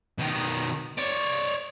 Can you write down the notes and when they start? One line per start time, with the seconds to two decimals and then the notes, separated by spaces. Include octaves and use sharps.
0.18 B2 D#3
0.98 C#5 D5